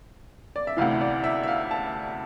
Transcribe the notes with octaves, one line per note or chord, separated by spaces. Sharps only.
D5
E5
D2 C3 E3 F5
D5
E5
E5
F5
A5